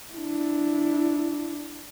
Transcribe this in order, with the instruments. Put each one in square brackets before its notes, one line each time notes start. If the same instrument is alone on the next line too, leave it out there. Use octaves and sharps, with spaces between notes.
[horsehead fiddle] D4 E4